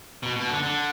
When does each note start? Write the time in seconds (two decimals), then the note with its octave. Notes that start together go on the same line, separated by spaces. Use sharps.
0.23 B2
0.36 B2
0.50 D3
0.63 D3